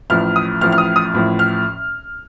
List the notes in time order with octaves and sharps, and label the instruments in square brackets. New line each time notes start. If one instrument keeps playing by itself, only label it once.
[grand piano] A1 A2 F3 F6
D#6
A1 A2 F3 F6
F6
D#6
D#6
A1 A2 F3
F6